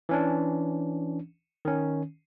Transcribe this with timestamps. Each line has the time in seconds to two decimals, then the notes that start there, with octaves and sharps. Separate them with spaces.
0.09 E3 C#4 D4
1.65 D#3 C#4